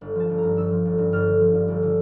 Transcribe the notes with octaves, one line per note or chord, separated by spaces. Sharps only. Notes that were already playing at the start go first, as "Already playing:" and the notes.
G1
F3 A5
G1
A#5
G2
G1 E6
F3
G1
G2
G1 F6
D3
F3
G2
G1
D3